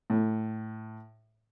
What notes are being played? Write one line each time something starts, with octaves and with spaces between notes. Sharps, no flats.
A2